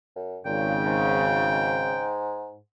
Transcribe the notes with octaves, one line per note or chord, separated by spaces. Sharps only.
F#2
G#1 A#2 C#3 G5
G#2